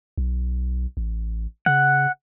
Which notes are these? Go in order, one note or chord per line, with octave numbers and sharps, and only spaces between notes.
B1
A1
C#3 F#5